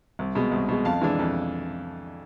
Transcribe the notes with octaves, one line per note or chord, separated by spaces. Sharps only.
C2
B2 G#3
C2
B2 G#3
F2 F5 A5
E3 G#3 D4
F2